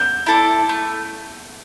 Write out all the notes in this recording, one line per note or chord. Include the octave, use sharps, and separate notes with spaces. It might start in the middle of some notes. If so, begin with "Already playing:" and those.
Already playing: G6
E4 A4 D5
A3